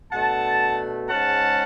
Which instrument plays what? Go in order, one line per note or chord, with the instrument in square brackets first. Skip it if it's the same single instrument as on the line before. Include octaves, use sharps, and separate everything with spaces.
[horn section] B2 A3 D4 F#5 A5
G#2 G#3 C#4 F#5 A5